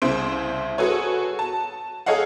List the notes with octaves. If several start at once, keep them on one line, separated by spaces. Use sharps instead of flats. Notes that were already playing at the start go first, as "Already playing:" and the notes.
C2 C#3 E4 C5 E5 D7
F#4 G#4 A4 B4 C#5
A5
G#4 A4 C#5 D#5 F5 F#5